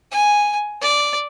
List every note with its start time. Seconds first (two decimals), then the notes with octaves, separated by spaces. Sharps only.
0.11 G#5
0.81 D5